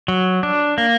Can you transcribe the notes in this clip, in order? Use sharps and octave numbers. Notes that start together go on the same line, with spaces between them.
F#3
D4
A#3